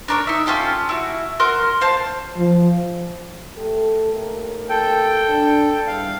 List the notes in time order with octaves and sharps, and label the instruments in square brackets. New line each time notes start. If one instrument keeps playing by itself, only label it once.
[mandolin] D4 A#4 C#5
D#4 E5
C#4 F4 G4 A4
E4 F#4
F#4 A#4 C6 F6
C5 F5 A5
[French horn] F3
[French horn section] A3 G4 A4
D#2 A3 A#4
[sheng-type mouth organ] A4 G5
[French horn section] D4
[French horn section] E2 G2 G3 [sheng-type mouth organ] F5